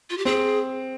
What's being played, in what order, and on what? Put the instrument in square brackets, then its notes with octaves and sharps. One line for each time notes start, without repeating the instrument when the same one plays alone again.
[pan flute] F4
G4
[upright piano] C4 [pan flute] G#4